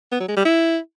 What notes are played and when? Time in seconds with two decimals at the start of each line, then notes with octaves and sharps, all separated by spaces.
0.12 B3
0.20 F#3
0.28 G#3
0.37 G3
0.45 E4